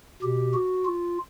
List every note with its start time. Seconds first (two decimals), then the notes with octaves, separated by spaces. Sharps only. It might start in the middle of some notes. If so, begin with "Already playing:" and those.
0.22 B2 G4
0.54 F#4
0.85 F4